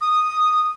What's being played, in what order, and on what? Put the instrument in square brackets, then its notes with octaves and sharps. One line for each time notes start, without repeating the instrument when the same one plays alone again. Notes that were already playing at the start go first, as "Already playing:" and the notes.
[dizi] D#6